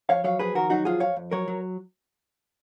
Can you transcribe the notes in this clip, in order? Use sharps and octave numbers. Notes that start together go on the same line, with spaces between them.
F2 C#5 F5
F#3 C#5 F5
F2 G#4 B4
D#3 F#4 A#4
F#3 D#4 F#4
F2 F4 G#4
F2 C#5 F5
F2
F#3 A#4 C#5
F#3